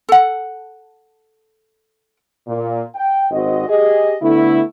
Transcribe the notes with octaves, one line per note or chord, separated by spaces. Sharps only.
A4 F#5
A#2
G5
G#1 C4 F#4 D#5
G4 G#4 D#5
D3 A3 B3 E4